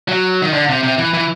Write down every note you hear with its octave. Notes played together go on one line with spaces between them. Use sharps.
F#3
D#3
D3
C3
C3
E3
E3